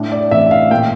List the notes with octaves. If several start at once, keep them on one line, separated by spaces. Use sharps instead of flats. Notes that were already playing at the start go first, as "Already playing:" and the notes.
Already playing: A2 D4
D5
A1 E5
F5
A#2 G5